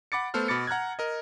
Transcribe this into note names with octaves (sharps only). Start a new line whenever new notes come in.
F#5 B5 D6 A6 C#7
A3 B3 A4 C5 F6
B2 B5 D6 A6 C#7
F#5 A#5 F6 F#6 G#6
A#4 D#5